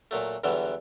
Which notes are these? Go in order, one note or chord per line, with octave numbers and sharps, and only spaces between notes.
A#2 F#3 A3
E2 D3 E3 F#3 G3